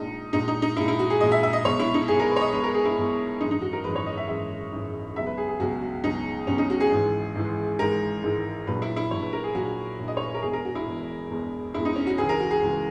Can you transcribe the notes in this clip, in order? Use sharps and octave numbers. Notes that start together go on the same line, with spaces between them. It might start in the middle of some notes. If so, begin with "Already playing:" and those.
Already playing: A#1 A#2 G#3 D#4
A#1 A#2 G#3 D#4
D#4
D#4
A#1 A#2 G#3 E4
E4
F#4
G#4
A#1 A#2 G#3 D#5
E5
E5
D#5
B1 B2 G#3 C#5
E4
D#4
B1 B2 G#3 G#4
A#4
B4
C#5
D#5
B1 B2 G#3 B4
A#4
G#4
E4
B1 B2 G#3
G#1 F#2 E3 G#3 D#4
D#4
F#4
A#4
G#1 F#2 E3 G#3 B4
C#5
D#5
E5
G#1 F#2 E3 G#3 E5
G#1 F#2 E3 G#3
C#2 B2 F#3 E5
B4
G#4
G#4
C#2 B2 F#3 F#4
F#4
C#2 B2 F#3 D#4
C#2 B2 F#3 C#4
D#4
F#4
G#4
G#1 G#2 E3 G#3
G#1 G#2 E3 G#3
G#1 G#2 E3 G#3 A#4
G#1 G#2 E3 G#3
A#1 A#2 F#3 B4
E4
E4
A#1 A#2 F#3 C#5
B4
A#4
G#4
A#1 A#2 F#3 F#4
A#1 A#2 F#3
D#5
C#5
B4
A#4
E1 E2 B2 G#3 G#4
A#4
F#4
E4
E1 E2 B2 G#3
E1 E2 B2 G#3
E1 E2 B2 G#3 E4
D#4
C#4
F#4
C#2 C#3 E3 G#3 G#4
A#4
F#4
G#4
C#2 C#3 E3 G#3